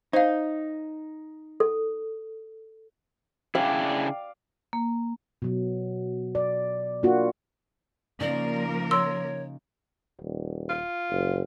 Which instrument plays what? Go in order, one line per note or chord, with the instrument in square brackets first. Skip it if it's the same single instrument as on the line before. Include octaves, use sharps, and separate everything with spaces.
[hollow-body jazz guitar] D#4 [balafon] C5 F5
[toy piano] A4
[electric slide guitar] C#3 D4 E4 [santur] D5 F5 [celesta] G5
[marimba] A#3
[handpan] B2 F#3
D5
A#3 D4 F4 F#4
[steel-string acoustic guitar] C#3 D#4 [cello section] F3 A#3 A#4 [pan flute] D5
[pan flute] C#5 [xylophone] C6 E6
[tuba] D#1
[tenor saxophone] F4
[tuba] F#1